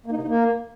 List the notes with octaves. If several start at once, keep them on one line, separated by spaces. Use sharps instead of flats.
A#3
D#4
C3
D#4
A#3